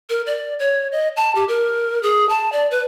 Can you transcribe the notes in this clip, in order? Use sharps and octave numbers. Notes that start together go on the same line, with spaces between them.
A#4
D5
C#5
D#5
A5
G4
A#4
G#4
A5
D5
B4